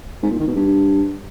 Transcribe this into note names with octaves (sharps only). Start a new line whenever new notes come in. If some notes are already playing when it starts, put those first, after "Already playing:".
G#2
A#2
D#3
B2
G2